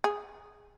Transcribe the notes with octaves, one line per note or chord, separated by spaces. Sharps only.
G#4